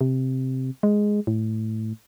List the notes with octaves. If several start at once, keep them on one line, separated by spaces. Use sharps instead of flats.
C3
G#3
A2